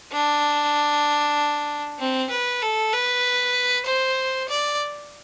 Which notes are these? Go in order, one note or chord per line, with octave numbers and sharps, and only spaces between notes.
D4
C4
B4
A4
B4
C5
D5